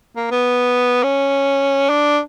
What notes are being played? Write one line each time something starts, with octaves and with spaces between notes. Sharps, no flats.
A#3
B3
C#4
D4